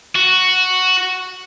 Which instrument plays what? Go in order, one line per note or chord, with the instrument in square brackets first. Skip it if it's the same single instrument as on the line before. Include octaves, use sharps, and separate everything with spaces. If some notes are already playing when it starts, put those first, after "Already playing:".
[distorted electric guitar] F#4